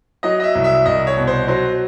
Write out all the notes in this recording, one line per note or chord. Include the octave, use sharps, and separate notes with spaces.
F#3 D#5
D#5
E5
C2
E5
C2 D#5
C#5
B2
C5
F#3 C5